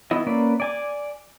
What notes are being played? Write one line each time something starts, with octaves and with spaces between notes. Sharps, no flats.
E3 B3 E4 D#5
A#3 C#4 B4 D5
D5 G#5 D6